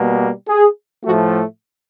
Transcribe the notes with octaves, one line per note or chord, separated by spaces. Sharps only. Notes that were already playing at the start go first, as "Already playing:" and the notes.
Already playing: B2 G3 A#3
G#4
A2 F3 A3 F#4